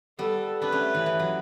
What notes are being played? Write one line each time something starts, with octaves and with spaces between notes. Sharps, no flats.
G3 B3 A4
B3 D4 B4
A3 C#4
E3
E3
F#3